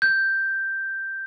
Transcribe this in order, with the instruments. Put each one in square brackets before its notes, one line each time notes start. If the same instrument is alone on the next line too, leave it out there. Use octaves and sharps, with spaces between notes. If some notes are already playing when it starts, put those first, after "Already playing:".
[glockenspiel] G6